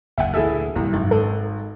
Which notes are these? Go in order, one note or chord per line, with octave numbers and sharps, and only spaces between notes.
F#1 D#2 D#3 E5 F#5
D2 A#2 E3 E4 G#4 A4 E5
D#1 C2
G#1 F#2
G#3 A4